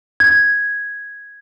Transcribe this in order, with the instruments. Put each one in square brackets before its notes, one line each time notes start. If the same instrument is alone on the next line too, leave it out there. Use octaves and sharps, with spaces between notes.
[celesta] G#6